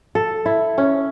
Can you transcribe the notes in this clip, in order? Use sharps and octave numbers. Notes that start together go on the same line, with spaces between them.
A4
E4
C#4